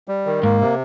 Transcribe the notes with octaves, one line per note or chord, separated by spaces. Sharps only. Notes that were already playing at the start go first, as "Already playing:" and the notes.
G3
D#3
G#2 A#3
C3